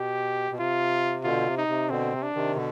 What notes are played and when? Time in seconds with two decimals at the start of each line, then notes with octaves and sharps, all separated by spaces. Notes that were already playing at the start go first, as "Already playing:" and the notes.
Already playing: B2 G4
0.51 B2
0.59 C3 F4
1.24 B2 D3 F4
1.47 C3
1.58 D#4
1.68 C3
1.90 B2 D3 C4
2.13 C3
2.23 D4
2.35 C3 D#3
2.56 B2 D3